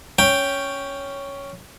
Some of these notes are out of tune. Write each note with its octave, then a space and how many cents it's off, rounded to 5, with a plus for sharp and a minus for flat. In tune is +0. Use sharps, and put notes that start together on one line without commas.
C#4 +5 G5 +0